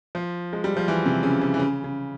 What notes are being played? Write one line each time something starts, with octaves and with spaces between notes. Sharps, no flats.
F3
G#3
G3
F3
E3
C3
C#3
C#3
E3
C#3
C#3